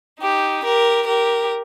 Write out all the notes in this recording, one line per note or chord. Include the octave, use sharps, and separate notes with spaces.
D#4 G4
G4 A#4
G4 A#4